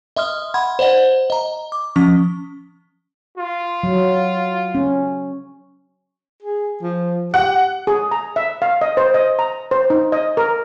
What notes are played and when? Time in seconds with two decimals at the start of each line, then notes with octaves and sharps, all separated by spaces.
0.16 D#5 E5 C6 D#6 F6
0.54 F#5 B5 C6 G#6
0.79 C5 D5 D#5 F#5
1.30 D#5 A#5
1.72 D6
1.96 F3 C#4 C#6
3.38 F4
3.83 F#3
4.75 C#4
6.43 G#4
6.82 F3
7.34 G4 F#5
7.87 G#4
8.11 A#5
8.36 E5
8.62 F5
8.81 D#5
8.97 C5
9.14 D#5
9.39 A#5
9.71 C5
9.90 D#4
10.12 D#5
10.37 A#4